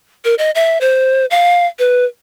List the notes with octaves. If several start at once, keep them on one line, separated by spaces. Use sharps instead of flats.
A#4
D#5
E5
C5
F5
B4